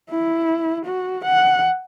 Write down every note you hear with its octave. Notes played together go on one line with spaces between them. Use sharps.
E4
F#4
F#5